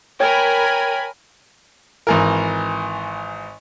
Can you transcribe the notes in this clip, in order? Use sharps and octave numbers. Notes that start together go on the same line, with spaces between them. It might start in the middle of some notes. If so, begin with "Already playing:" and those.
A#4 C#5 G5 G#5 B5 G#6
G#1 E3 A#4